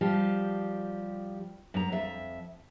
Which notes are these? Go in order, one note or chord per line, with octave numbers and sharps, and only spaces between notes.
F3 G3 G4
F#2 A#5
F2 E5